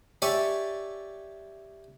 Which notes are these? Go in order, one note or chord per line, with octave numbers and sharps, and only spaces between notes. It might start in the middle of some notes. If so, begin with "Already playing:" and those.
G4 C#5 D5 E5 G#5 A5